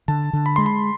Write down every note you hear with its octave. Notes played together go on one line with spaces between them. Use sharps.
D3 A5
D3
B5
G#3 C6
B5